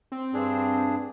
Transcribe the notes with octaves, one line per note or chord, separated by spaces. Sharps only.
C4
G2 D4 G#4